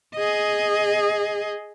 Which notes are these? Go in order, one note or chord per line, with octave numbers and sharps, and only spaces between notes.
G#4 D#5